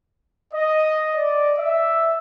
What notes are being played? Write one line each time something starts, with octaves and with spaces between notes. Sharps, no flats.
D#5
D5
E5